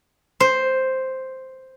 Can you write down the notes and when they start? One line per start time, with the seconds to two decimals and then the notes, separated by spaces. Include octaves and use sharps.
0.40 C5